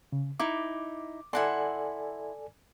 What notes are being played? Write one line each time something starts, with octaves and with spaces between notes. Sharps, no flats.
C#3
D#4 E4 D6
E4 A4 D5 F#5 G#5 C6